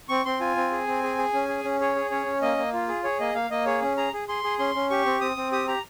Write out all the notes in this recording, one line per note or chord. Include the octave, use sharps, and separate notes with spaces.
C4 C#6
C4 C6
F4 G#5
C4
G#4
C4
G#4
G#4
C#4
G#4
C#4
G#4 C#5
G#4
C#4 C#5
C#4
A#3 D#5
A#3
F4
G#4
G#4 C#5
A#3 D#5
A#3 F5
A#3 D#5
G#4 C#5
C#4
G#4 A#5
G#4
G#4 C6
G#4
C#4 C6
C#4
G4 C#6
C4
C4 D#6
C4
G4 D#6
G4 A#5